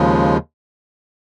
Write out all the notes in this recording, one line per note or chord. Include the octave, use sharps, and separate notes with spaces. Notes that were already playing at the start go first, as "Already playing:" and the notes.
Already playing: D#2 C#3 F3 G#3